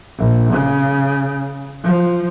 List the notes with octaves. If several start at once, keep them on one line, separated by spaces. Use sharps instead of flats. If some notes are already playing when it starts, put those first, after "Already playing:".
A#1
C#3
F3